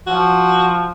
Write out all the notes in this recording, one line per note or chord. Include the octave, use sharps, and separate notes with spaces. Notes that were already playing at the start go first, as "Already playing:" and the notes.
F3 F#4